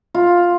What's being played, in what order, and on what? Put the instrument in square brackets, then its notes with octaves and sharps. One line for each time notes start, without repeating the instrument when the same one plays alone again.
[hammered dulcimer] F4